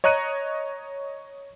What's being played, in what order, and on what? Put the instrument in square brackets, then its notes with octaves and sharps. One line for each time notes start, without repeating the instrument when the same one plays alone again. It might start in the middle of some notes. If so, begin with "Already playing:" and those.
[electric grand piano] C#5 D#5 A#5 F#6 C#7 D#7